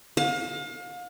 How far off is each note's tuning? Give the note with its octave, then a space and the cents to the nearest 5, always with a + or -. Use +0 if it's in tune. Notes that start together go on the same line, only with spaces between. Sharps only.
F5 +35